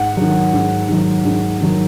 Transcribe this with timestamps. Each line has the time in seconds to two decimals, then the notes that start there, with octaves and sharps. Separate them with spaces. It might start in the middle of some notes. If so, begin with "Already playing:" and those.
Already playing: G#2 F#5
0.17 D#3 F#3
0.53 G#2
0.89 D#3 F#3
1.25 G#2
1.61 D#3 F#3